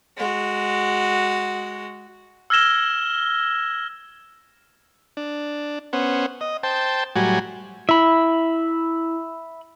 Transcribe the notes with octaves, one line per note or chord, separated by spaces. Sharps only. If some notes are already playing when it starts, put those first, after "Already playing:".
G#3 F#4
E6 F6 G#6 A#6 E7 G7
D4
B3 C#4 C5 F#5
D#5
C5 G5 A5
A2 F#3 G3 F#4 G#5
E4 E5 B5